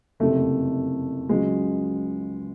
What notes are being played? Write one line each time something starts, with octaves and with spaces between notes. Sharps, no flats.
F#1 F2 C3 A3
C#2 C#3 F#3 G#3